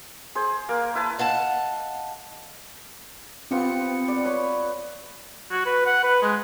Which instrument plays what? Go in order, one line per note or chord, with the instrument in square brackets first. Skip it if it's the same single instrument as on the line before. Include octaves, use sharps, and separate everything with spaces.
[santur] G#4 C5
A#3 A#4
E4 B4 A5
[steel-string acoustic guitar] D#5 F5 F#5 A5
[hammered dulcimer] B3 F4 G4 [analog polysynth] C4 C#7
[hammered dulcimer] D5
B4 C#5
[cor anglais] F#4
B4
F#5
B4
G#3